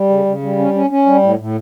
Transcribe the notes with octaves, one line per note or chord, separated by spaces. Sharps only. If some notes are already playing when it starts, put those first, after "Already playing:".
Already playing: G3
C#3
C#3
G3
C#4
C#4
C#4
G3
A2
A2